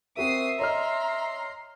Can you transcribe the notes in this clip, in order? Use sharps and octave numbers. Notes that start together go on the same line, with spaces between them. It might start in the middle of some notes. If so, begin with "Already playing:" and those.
C4 F#4 A#4 E5 D#6 C7
C#5 D#5 A#5 C6 F6